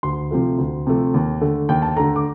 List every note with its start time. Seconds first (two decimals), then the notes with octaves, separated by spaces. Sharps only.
0.03 D2 C6
0.31 C3 F3 A3
0.58 D2
0.87 C3 F3 A3
1.14 D#2
1.41 D3 A3
1.69 D#2 G5
1.82 A5
1.97 D3 A3 A#5
2.16 D6